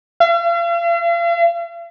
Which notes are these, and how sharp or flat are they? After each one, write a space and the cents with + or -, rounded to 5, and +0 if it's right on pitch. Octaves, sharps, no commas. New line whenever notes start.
F5 -45